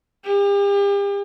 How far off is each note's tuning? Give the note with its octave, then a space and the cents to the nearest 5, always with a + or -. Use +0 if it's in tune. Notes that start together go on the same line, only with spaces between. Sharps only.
G4 +40